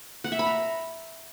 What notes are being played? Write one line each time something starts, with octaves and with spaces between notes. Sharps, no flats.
F#5
E5
B5
A#5